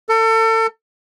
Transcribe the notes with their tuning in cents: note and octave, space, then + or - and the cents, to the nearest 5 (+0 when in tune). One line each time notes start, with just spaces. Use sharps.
A4 +35